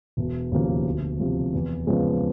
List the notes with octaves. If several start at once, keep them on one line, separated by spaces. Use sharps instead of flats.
E1
D#2 C#3 F3 A#3
D2
C3 F3
E2
C#3 F3 G#3 B3